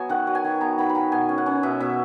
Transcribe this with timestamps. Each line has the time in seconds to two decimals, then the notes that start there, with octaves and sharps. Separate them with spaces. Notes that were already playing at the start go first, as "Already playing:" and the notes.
Already playing: F#3 B3 G#5
0.09 D#3 F#5
0.27 F#3
0.35 G#5
0.44 D#3
0.61 B3 A#5
0.78 D#3 B5
0.90 B5
0.95 D#3 A#5
1.12 B2 G#5
1.29 C#4
1.38 F#5
1.46 C#4
1.63 B2 E5
1.80 B2 E5